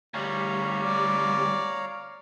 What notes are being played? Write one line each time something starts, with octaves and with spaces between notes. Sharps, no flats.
D2 G3 C#5 F5 A#5
D5